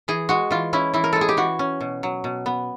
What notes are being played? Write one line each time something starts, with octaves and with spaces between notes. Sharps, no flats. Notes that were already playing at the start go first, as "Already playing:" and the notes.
E3 G#4
G#3 F#4
E3 F4
C#4 E4
E3 E4
A#4
G#3 A4
G#4
G4
E3 F#4
C#4
B2
F#3
B2
B3